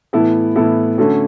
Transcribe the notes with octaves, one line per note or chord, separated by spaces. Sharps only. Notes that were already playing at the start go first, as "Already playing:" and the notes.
A2 E3 B3 E4 A4
A2 E3 B3 E4 A4
D3 A3 C#4 F#4 A4